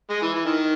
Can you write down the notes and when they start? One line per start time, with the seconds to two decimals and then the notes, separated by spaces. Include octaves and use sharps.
0.10 G#3
0.22 E3
0.34 E3
0.46 D#3